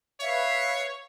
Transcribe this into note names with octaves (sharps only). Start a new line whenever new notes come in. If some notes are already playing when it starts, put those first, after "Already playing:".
B4 C#5 E5 F5